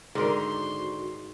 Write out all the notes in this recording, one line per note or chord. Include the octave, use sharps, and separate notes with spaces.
G#2 D3 D#3 F#4 A#4 C5 C6